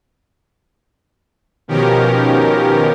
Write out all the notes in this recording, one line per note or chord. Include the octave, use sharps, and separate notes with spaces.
B2 D#3 F3 C#4 G4 A#4